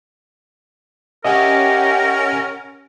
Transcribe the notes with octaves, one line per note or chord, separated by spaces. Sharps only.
C#4 G4 A#4 D#5 E5 F#5